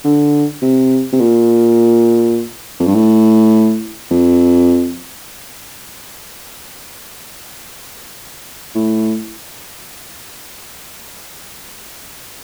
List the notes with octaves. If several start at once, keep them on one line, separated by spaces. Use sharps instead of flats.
D3
C3
C3
A#2
F2
G2
A2
F2
A2